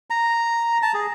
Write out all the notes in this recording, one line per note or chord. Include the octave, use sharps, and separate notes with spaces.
A#5
A5
G#4